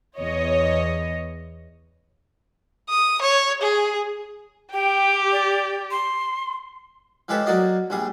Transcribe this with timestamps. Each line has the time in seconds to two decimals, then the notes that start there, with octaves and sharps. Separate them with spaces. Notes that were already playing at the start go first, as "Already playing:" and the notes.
0.19 E2 C#5 D#5
2.90 D#6
3.22 C#5
3.61 G#4
4.73 G4 G5
5.32 D5
5.91 C6
7.28 F3 G#3 G4 A4 B4 C#5
7.46 F#3 A#3 F#4 D5 D#5
7.90 A#1 G3 G#4